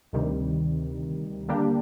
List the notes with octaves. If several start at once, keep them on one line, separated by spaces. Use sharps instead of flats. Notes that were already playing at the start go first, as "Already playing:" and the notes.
D2 C3 D#3 G3
D3 G3 A#3 D4 G4